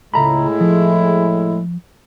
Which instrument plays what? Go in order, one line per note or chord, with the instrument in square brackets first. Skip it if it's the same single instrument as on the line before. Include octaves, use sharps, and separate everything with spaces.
[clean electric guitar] C#2 A#5 B5 [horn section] A2 G#3 E4
[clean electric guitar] F3